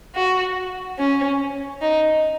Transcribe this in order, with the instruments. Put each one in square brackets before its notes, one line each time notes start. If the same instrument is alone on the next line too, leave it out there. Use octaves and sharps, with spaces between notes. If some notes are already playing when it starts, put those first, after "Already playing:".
[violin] F#4
C#4
D#4